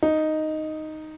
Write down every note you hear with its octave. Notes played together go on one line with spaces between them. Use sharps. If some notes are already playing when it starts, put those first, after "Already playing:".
D#4